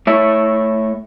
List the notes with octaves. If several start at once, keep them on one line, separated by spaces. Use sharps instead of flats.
A3 C#5 E5